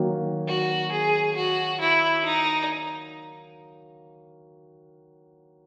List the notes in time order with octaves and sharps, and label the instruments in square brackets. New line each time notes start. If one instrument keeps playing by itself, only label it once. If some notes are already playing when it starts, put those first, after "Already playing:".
Already playing: [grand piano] D#3 F#3 A#3
[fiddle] F#4
G#4
F#4
E4
D#4